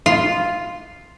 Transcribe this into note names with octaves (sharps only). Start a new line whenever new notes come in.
F4